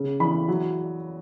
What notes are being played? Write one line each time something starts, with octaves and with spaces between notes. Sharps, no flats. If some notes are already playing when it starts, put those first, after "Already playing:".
Already playing: C#3
E3 B5
F#3